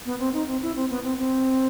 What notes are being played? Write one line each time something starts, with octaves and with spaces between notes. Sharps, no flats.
B3
C4
D#4
C4
E4
C4
B3
C4
C4